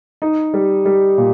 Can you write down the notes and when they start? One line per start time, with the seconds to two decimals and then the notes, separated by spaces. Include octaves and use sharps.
0.22 D#4
0.54 G3
0.85 G3
1.18 A#2